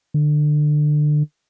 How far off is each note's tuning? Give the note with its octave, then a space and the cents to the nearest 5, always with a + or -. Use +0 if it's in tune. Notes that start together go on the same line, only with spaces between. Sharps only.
D3 +25